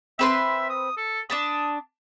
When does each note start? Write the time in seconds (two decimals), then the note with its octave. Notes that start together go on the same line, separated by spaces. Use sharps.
0.19 C4 B4 E5 C6
0.70 D#6
0.97 A4
1.30 D4 A5 B5 D#6